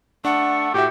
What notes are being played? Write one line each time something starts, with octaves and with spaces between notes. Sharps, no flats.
A3 D4 F#5
A2 F#4 G4 E5